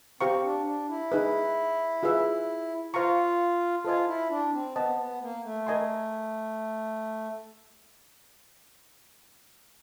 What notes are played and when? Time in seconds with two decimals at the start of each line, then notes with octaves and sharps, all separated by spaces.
0.21 C4 G4 C5 F5 A#5 C#6
0.44 D4
0.66 D4
0.89 E4
1.12 D#4 G#4 B4
2.03 F4 G#4 B4 E5
2.93 F4 C5 F5 A#5 C#6
3.85 F4 A4 C5 D#5 G#5
4.08 E4
4.30 D4
4.53 C4
4.76 B3 C5 D#5 F#5 A5
4.98 B3
5.21 A#3
5.44 A3
5.66 A#4 D#5 G#5 C6